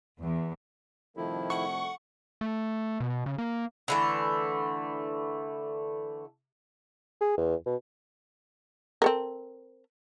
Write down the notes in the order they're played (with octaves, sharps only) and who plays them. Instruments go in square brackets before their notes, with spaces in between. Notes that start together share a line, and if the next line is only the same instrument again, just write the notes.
[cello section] E2
[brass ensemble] C2 F2 A3 [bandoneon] D#3 F3 E4
[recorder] F#5 [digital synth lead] C#6
[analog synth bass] A3
B2
C#3
A#3
[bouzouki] D3 E3 A3
[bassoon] G#4
E2
B2
[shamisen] C4 A4 A#4